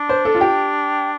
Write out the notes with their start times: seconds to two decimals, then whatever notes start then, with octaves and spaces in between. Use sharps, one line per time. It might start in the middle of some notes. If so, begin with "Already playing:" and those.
Already playing: D4
0.09 C5
0.25 A4
0.35 F4
0.41 G4